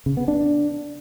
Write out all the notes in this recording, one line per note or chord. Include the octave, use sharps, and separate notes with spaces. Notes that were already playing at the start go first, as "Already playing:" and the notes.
C#3
B3
D4